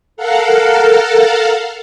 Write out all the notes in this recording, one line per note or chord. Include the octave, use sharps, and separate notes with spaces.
A4 A#4 F5 F#5